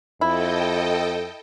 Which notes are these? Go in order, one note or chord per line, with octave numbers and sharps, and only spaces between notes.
F2 E4 A4 D#5 G5